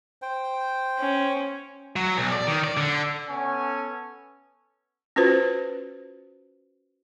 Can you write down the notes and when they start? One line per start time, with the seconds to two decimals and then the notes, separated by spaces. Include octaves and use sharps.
0.22 C5 G5
0.99 C#4
1.96 F#3
2.17 B1
2.32 D5
2.47 D#3
2.64 D5
2.77 D3
3.29 B3 C#4 A4 F#5 G#5
5.16 C#4 F4 F#4 B4 C5